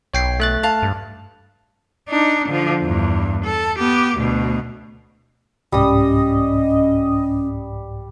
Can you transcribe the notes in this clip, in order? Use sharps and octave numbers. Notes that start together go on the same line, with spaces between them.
B1 C#5 G5 C7
A3 F#6 A6
F5 A5
G2
D4 D#4
D3 F3
E2 G2
A4
B3 G4
D2 B2
C2 G#2 G3 C#4 D#5 D#6